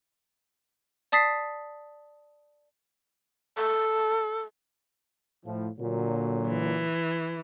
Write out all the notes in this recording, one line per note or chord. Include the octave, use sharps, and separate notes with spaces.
D5 A5 D#6 A6 B6 C7
A4
A2 F3
A#2 D3 F#3
E3